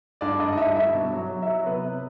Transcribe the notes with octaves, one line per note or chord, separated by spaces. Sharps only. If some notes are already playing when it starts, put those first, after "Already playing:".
G2 D4 D5
G2 D#4 D#5
D#5
G2 E4 E5
G2 E4 E5
B2
F#3
F#3
E4 E5
F#3
C3 B3 B4
C3